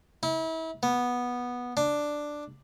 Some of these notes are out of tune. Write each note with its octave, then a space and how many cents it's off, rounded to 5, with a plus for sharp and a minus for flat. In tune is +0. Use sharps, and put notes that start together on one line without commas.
E4 -35
B3 -10
D4 +5